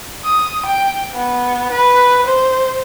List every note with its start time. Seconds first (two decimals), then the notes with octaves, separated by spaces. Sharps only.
0.25 D#6
0.65 G5
1.14 B3
1.71 B4
2.26 C5